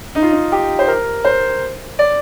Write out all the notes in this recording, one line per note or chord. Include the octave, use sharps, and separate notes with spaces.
D#4
F4
D#4
G4
C5
A#4
C5
D5